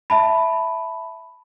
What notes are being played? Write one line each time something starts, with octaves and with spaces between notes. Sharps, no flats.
E5 A5 B5